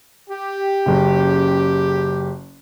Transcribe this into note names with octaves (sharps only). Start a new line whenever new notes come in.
G4
F#1 C#3